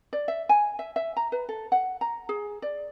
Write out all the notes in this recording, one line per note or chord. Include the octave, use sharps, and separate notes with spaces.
D5
E5
G#5
E5
E5
A#5
B4
A4
F#5
A#5
G#4
D5